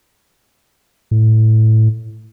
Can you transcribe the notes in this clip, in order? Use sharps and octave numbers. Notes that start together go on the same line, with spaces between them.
A2